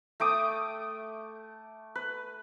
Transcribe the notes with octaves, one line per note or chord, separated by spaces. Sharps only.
A3 G5 D6 D#6
B4